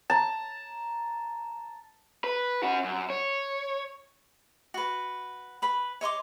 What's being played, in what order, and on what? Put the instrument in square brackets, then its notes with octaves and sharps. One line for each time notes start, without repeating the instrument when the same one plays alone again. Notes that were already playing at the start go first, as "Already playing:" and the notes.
[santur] A5 A#5
[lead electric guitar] B4
C#4 F#4
F#2
C#5
[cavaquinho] F#4 B4
B4 B5
C#5 D#5 C6 D6